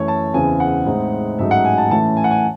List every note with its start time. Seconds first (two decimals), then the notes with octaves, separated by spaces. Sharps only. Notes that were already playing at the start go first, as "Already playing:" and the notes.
Already playing: F#2 E3 A3 C#5
0.08 A5
0.34 E2 C#3 E3 C4 G#5
0.60 F#5
0.86 A2 G#3 C4 D#4
1.39 A1 G#2 F#3 A3 D#4 E5
1.51 F#5
1.65 G#5
1.78 A5
1.90 A2 E3 A3 C#4 A5
2.17 G#5
2.24 F#5
2.31 G#5